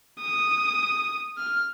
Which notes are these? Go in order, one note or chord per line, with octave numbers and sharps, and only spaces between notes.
D#6
F6